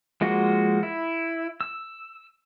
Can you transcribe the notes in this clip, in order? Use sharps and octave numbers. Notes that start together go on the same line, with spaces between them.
F3 G#3 A#3 F#4
E4
E6